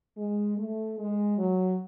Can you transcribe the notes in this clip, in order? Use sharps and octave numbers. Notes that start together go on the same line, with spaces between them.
G#3
A3
G#3
F#3